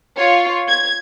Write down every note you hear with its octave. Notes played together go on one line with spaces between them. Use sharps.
F4 C#5
G#6